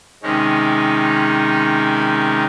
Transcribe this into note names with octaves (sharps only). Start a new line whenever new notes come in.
C3 D#3 G#3 C#4 D#4